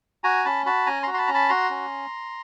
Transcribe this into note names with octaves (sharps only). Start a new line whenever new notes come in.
F#4 G#5 A#5
C#4 A5 B5
F#4 A5 B5
C#4 G#5 A#5
F#4 A#5 C6
C6
A5 B5
C#4 A#5
A5 B5
F#4 A#5 C6
C#4